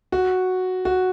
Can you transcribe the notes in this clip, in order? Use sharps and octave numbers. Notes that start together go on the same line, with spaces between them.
F#4
F#4